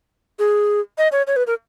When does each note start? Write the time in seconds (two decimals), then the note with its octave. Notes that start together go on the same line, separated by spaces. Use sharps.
0.39 G#4
0.98 D#5
1.12 C#5
1.27 C#5
1.36 B4
1.47 A#4